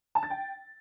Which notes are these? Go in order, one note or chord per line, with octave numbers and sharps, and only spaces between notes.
A5
A6
G5